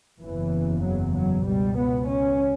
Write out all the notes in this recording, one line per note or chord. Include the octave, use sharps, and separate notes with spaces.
F#1 E2 C#3 E3
F#3
F#3
C#2 B2 G3
B3
C#4